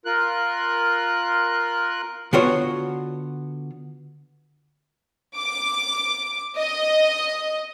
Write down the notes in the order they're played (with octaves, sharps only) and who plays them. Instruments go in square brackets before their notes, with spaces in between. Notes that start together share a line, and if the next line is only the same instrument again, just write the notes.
[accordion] F4 A#4 F#6
[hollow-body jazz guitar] D3 B3 F4 F#4 C#5
[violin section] D6
D#5